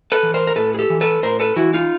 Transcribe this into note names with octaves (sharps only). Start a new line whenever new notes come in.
A4 B4
E3
A#4 C5
A#4
A2 A4 B4
G#4
G4 A4
E3
A4 B4
A2 A#4 C5
A4 B4
E3 E4 F#4
D#4 F4